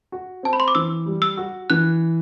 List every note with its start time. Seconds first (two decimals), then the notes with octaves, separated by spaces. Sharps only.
0.12 F#4
0.43 C4 A5
0.53 B5
0.60 C6
0.68 D6
0.75 E3 E6
1.06 G3
1.22 E6
1.37 F#4
1.70 E3 F#6